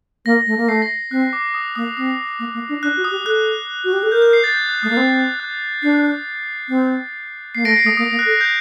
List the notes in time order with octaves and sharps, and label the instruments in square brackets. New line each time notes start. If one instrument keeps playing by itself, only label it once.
[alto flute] A#3 [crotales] A#6
[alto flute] A3
A#3
[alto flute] A3 [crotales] C7
[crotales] A#6
[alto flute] C4 [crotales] F#6
[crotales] D6
D#6
[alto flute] A#3 [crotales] D#6
[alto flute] C4 [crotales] D#6
[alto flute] A#3
A#3
D4
[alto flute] D4 [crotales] F#6
[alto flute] F#4
[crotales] D#6
[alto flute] G4
[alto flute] A4 [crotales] F#6
[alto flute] F#4
G4
A4
[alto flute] A#4 [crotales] G6
[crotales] G6
C7
A6
G6
F#6
[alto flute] A3 [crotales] D#6
[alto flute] A#3
C4
[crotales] F#6
[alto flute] D4 [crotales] C7
[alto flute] C4
[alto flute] A#3 [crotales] C7
[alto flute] A3 [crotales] A#6 D7
[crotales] C7
[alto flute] A3 [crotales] D#6
[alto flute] A#3 [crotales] D#6
[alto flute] A#3
[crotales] F#6
[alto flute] A4
[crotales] G6